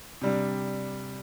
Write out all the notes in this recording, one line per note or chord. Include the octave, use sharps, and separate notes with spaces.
C3 G3 D4